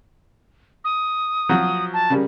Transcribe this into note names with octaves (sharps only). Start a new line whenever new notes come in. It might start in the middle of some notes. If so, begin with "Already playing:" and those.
D#6
F3 F#3 F#4
A5
C#3 G3 A#4